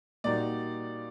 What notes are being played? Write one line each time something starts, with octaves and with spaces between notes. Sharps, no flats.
A#2 G3 A#3 D#4 F#4 D5